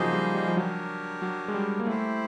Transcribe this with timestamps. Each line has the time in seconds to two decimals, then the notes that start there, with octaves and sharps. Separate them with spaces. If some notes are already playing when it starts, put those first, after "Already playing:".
Already playing: C#3 F3 F#3 A#3 D#4 G#4 C5 D#5
0.13 G3
0.35 G3
0.48 F3
0.56 F#3 D4 G4 A#4 C#5
1.22 F#3
1.48 G#3
1.54 G3
1.80 A#3
1.87 A3 E4 G4 C5